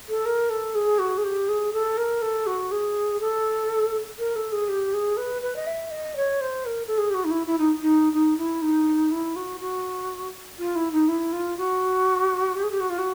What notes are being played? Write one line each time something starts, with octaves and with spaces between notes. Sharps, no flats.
A4
A#4
A4
G#4
F#4
G#4
G4
G#4
A4
A#4
A4
F#4
G#4
A4
A#4
A4
G#4
G4
G#4
B4
B4
D#5
E5
D#5
C#5
C5
A#4
A4
G#4
G4
F#4
D#4
E4
E4
D#4
D#4
D#4
E4
D#4
E4
F#4
F#4
F4
E4
D#4
E4
F4
F#4
G4
G#4
G4
F#4
F4
F#4